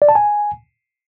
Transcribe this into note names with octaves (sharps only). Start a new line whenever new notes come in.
D5
A5
G#5